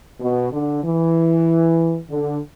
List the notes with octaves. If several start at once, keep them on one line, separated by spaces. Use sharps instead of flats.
B2
D3
E3
D3